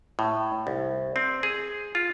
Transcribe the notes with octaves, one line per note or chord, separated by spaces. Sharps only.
A2
C2
C4
G#4
F4